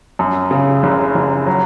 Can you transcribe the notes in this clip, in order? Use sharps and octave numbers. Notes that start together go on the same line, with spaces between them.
F#2
C#3
F#1
F#1
F#3